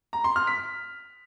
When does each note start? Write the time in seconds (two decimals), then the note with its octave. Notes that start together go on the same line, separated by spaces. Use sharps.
0.13 A#5
0.24 C6
0.36 F6
0.47 B6